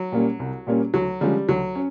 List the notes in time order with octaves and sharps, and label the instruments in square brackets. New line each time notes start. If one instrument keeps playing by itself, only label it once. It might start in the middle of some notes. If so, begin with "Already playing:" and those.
Already playing: [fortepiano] F#3
[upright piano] A#2 G3 A#3 C#4
C2
A#2 G3 A#3 C#4
[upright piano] D2 [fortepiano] F#3
[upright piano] D3 F3 G#3 C#4 [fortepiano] G3
[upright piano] D2 [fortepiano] F#3
[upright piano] C#4